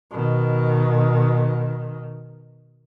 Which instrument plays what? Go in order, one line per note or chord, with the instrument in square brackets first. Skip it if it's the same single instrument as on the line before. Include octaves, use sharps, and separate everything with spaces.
[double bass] B2 D#3